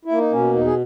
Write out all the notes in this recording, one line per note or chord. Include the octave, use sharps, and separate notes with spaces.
E4
A#3
D#4
B2 C#4
E2 D#4
G#4